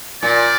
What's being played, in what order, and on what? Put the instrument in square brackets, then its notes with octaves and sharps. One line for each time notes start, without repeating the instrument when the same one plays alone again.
[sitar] A#2 [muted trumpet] D5